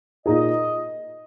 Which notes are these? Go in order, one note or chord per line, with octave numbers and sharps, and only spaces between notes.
A#2 A#3 D#4 G#4 D#5